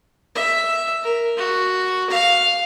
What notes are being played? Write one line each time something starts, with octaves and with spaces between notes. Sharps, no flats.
E5
A#4
F#4
F5